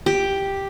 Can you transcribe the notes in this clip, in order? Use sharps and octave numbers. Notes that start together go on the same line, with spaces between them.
G4